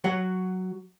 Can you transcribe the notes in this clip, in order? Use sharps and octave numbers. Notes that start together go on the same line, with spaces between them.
F#3 F#4 F#5